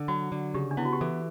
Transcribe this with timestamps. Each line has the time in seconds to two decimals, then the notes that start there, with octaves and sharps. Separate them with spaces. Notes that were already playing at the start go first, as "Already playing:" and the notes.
Already playing: D3
0.08 F#3 F#4
0.32 D3
0.54 C#3 G4
0.71 D4
0.77 B3 E4
0.85 F#4
0.93 G4
1.01 E3 A4